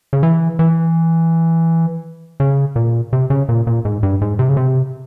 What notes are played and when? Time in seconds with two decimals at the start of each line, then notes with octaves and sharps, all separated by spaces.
0.13 C#3
0.23 E3
0.59 E3
2.40 C#3
2.76 A#2
3.13 C3
3.30 C#3
3.49 A#2
3.67 A#2
3.85 G#2
4.03 G2
4.21 G#2
4.39 C3
4.49 C#3
4.57 C3